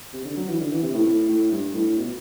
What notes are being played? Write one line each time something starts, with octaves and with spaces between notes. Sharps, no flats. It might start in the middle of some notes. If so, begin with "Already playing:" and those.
C3
D3
F#3
E3
D3
E3
C3
A2
A2
A2
G2
A2
B2